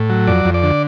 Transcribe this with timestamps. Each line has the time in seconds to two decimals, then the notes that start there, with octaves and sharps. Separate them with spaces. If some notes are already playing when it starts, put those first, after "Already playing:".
Already playing: A2
0.10 F#3
0.27 F2 D5
0.45 F2
0.54 D5
0.63 D3